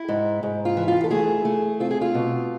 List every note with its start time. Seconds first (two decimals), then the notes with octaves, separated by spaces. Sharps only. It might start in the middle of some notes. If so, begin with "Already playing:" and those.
Already playing: E4
0.09 G#2
0.43 G#2
0.65 F4
0.77 E3
0.88 F4
1.04 A4
1.11 A3 G#4
1.45 A3
1.80 C4 F4
1.91 G#4
2.01 F4
2.14 B2